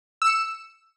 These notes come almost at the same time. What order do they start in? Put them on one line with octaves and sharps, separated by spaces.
E6 E7 C#7